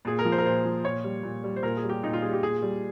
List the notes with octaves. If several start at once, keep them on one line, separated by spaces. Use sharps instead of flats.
A#2 G#4
A#4
F3
C5
A#4
A#2 C5
F3
A#2 C#5
G3
A#2
G3
C5
A#2 A#4
G#4
G3
G4
A#2 D#4
F4
G3 G#4
G4
A#2 G#4
G3